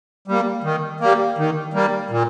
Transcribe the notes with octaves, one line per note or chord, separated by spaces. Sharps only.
G3 A#3
D#3
G3 A#3
D#3
G3 A#3
A#2